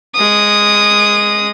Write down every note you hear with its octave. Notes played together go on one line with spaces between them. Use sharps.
G#3 D#6